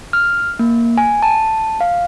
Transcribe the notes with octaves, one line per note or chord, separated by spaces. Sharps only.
F6
A#3
G#5
A5
F5